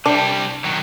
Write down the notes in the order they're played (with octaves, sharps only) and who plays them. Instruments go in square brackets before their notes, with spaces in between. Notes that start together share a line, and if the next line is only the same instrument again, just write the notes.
[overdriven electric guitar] C3 G3 [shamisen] D4
[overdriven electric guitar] D#3 F#3